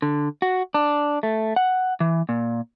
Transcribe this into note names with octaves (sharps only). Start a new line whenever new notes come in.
D3
F#4
D4
A3
F#5
E3
A#2